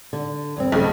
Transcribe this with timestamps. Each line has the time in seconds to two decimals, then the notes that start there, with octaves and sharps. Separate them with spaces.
0.13 D3
0.56 E2 G2 C4
0.72 B1 C#3 A3